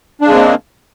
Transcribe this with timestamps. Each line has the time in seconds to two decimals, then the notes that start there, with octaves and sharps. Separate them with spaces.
0.21 D4
0.24 C#3
0.28 G#3
0.31 C4
0.34 A#3